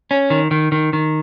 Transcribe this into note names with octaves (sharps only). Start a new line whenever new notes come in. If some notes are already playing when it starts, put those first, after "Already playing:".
C#4
D#3
D#3
D#3
D#3